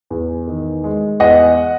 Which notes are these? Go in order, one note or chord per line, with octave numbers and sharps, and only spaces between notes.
E2
D#3
G#3
E2 D#5 F#5